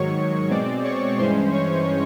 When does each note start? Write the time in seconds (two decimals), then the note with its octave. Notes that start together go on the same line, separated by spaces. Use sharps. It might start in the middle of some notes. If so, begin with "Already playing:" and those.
Already playing: G#2 D#3 F#3 C#5 C#6
0.50 B2 G#3 C4 D5 D6
0.83 C#5 C#6
1.18 G2 E3 G#3 C#4 C5 C6
1.52 C#5 C#6